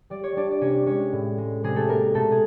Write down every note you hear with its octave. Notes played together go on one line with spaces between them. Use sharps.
G3 D5
C#5
G3 D4 D5
D5
C3 C#4 C#5
G#3 C#4 C#5
A2
G#3
C3 G#3 G#4
A3 A4
G#3 A#3 A#4
B2 A3 A4
G#4